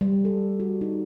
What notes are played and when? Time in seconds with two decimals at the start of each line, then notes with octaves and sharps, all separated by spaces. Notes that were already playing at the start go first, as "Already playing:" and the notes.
0.01 G3
0.25 A4
0.60 F#4
0.81 D#4